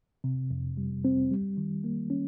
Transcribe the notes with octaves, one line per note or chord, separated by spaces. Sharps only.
C3
F2
G3
C4
G3
D#3
A#3
C#4